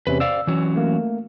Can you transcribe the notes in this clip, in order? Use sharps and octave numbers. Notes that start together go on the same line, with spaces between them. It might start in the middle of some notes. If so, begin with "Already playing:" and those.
E2 C3 C#4 B4
C5 D5 F5 E6
E3 F#3 C#4
A3 A#3